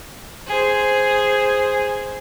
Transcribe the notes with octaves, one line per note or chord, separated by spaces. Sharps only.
G#4 C5